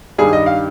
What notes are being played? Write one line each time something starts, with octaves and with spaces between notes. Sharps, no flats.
G2 D#3 G3 G#4
D#5
F5